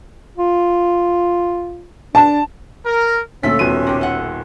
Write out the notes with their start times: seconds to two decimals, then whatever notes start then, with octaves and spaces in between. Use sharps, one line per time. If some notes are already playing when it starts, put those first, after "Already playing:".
0.37 F4
2.15 D4 A5
2.85 A#4
3.43 D2 A#2 F3 A3 C#4 A4 E5 B6
3.59 D#1 B2 C6 D#7
3.87 C3 G4
4.01 A4 E5 F#5